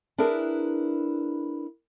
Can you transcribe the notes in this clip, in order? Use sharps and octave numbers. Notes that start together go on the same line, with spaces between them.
D4 E4 G#4 A#4 B4